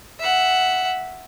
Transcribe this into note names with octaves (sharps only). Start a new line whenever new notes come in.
E5 F#5